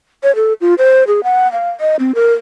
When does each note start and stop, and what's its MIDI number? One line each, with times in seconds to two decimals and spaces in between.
0.23 0.34 73
0.36 0.53 69
0.61 0.74 65
0.78 1.04 72
1.07 1.23 68
1.24 1.50 78
1.52 1.70 77
1.80 1.96 75
1.99 2.14 60
2.15 2.33 70